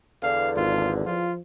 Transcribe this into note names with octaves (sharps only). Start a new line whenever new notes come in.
E2 D3 F5
G#1 F4
F3 F4